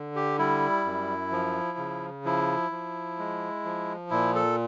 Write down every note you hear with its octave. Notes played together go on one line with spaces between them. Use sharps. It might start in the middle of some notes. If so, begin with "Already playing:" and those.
Already playing: D3
G4
G3 E4
F#2
F3
C#3
F3 E4
F3
G#3
F3
A#2 E4
A4